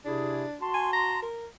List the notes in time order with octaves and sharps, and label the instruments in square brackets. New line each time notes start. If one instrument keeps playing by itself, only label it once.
[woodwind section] C3 E4 G#4 [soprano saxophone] D4
[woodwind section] F#4 A5 C6
[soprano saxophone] G#5
A#5
A#4